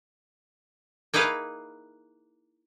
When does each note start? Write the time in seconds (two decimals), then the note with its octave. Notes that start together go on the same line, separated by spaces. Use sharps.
1.14 A#3 D#4 E4 G#4 B4 F5